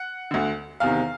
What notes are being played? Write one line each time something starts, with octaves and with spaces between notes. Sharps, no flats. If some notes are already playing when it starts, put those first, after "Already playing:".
Already playing: F#5
D2 D3
E2 C3 D#3 F5